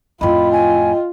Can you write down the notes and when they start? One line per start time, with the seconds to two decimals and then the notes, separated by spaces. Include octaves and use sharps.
0.21 F2 A2 F4 D#5 G5 B5
0.52 G#5